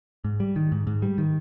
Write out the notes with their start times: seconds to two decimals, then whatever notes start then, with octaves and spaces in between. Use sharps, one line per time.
0.24 G#2
0.40 G3
0.56 D#3
0.72 G#2
0.87 G#2
1.02 G3
1.18 D#3